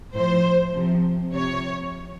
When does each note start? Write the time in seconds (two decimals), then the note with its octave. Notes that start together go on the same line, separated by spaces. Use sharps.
0.14 A2 F3 C5
0.73 C3 F3
1.33 C3 F3 C#5